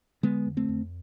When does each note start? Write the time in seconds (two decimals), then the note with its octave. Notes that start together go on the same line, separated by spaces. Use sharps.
0.23 D3 G#3 B3
0.46 F2
0.57 A3 C4
0.69 F2